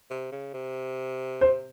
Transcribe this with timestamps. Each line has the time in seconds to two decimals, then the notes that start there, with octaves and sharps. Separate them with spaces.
0.10 C3
0.32 C#3
0.54 C3
1.41 C5